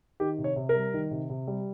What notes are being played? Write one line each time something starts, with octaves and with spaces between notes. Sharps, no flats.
D#3 G4
C3
C#5
C3
A#4
G3
D#3
C3
C3
G3